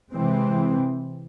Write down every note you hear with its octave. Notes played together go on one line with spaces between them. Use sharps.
C3 E3 G#3 C4